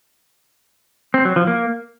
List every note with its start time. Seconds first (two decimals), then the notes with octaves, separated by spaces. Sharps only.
1.14 C4
1.25 F#3
1.36 F3
1.47 A#3